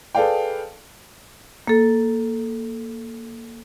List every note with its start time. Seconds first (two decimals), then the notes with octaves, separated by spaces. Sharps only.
0.15 G#4 A4 B4 D5 F5 G5
1.67 A#3 A4